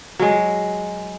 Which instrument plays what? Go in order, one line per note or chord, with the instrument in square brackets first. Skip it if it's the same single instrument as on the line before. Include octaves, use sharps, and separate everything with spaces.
[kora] F#3 G#3